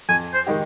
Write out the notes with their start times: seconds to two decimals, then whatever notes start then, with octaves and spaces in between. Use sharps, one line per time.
0.09 F2 G#5
0.34 C5
0.46 D#3 G#3 D#4 G4